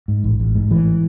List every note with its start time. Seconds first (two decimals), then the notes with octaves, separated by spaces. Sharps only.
0.08 G#2
0.24 A1
0.40 A1
0.55 G#2
0.70 A1 E3